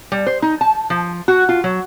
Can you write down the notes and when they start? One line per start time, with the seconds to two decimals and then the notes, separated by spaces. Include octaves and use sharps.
0.12 G3
0.27 C5
0.42 D#4
0.61 A5
0.90 F3
1.28 F#4
1.49 F4
1.64 F#3